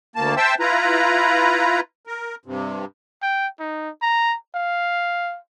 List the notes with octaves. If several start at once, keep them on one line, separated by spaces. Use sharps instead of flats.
D2 A#3 A5
C5 E5 G5 A5 E6
E4 F4 B4 A#5
A#4
G2 C3
G5
D#4
A#5
F5